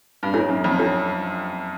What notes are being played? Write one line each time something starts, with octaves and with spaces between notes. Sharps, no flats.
G2
G#2 D4 F4 A4 C#5
F#2
F2
D4 F4 A4 C#5